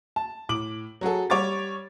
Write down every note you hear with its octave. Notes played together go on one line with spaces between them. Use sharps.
A5
A2 D6 F#7
F#3 F#4 G#4 A4
G3 C#5 D6 A6